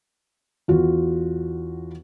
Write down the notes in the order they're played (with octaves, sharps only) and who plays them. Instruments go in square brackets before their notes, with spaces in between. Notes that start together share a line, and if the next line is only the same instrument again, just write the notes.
[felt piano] E2 F4 F#4